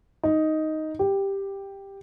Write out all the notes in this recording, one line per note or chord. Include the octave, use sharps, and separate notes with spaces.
D#4
G4